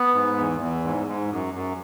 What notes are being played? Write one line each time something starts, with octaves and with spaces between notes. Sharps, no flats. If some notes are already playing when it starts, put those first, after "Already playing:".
Already playing: B3
G#2
E2
E2
G#2
G#2
F#2
F#2